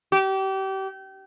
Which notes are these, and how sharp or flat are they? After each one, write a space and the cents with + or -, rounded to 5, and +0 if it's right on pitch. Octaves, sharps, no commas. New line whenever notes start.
G4 -30